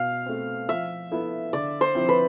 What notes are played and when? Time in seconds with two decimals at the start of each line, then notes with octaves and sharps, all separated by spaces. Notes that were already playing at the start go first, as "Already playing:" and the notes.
Already playing: B2 F5
0.26 A3 C4
0.69 F3 E5
1.11 B3 E4 A4
1.53 D3 D5
1.81 C5
1.95 F3 C4 E4
2.09 B4